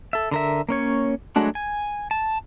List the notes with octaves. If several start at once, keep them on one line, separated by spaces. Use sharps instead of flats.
A4 E5
D3 A#4 E5
A#3 C#4 C#5
F#3 G#3 A3 D4 F#4
G#5
A5